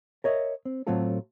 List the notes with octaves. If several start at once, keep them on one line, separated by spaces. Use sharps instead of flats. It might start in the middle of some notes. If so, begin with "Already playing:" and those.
A#4 C#5 D#5 E5
C4
A2 F#3 A3 C4 F4 A4